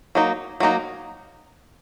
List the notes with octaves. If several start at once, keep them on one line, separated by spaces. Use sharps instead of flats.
F#3 A#3 D#4
F#3 A#3 D#4